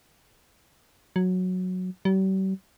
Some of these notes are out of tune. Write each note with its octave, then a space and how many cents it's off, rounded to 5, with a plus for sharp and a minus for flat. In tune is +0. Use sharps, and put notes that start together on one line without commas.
F#3 -10
G3 -45